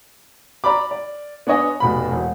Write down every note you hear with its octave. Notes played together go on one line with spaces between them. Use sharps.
D5 A#5 B5 D6
D5
B3 D4 C#5 D#5 G#5
F1 B2 B5
E1